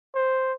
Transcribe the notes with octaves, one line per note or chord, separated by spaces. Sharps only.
C5